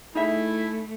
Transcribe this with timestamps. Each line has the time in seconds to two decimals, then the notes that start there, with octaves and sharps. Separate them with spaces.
0.15 A3 D#4 E4 G#4 E5